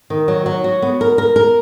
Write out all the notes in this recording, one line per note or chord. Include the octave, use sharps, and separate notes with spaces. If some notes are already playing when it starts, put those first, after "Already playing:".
D#3
F#3
F#3
F#4
B3
A#4
A#4
A#4